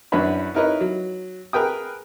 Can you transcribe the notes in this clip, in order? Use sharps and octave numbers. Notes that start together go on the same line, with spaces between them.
F#2 D4 E4 B4 C#5 B5
D#4 E4 A#4 B4 C#5 D#5
F#3
G#4 A#4 B4 G5 D#6